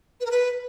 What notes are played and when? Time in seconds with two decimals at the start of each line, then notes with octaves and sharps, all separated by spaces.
0.20 B4
0.26 A#4
0.31 B4